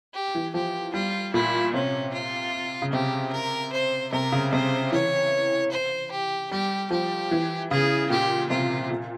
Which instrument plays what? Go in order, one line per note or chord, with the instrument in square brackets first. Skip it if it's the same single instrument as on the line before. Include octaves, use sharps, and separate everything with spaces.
[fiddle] G4
[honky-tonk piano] E3
[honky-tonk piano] F3 [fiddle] G4
[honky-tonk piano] G3 [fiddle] F4
[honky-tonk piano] A#2 [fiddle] E4
[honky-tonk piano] C3 [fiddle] C#4
[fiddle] F4
[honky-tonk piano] C#3
[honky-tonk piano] C3 [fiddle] G4
[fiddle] A#4
C5
[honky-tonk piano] C3 [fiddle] A#4
[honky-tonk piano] C#3
[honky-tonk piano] C3 [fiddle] C5
[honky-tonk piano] E3 [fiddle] C#5
[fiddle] C5
G4
[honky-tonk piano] G3 [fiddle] G4
[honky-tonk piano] F3 [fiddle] G4
[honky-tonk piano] E3
[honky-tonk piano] C#3 [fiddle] G#4
[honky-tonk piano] A#2 [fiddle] G4
[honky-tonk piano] C3 [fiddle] F4
[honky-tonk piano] A#2